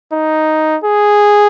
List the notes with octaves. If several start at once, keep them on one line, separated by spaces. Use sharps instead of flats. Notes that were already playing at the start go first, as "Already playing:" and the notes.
D#4
G#4